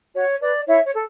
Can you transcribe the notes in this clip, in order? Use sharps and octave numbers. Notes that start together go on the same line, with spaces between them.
F#4 C#5
B4 D5
E4 C#5 E5
C#5
A4